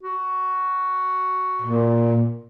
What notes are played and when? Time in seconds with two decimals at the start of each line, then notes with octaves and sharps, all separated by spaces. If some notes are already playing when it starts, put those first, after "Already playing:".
0.03 F#4
1.62 A#2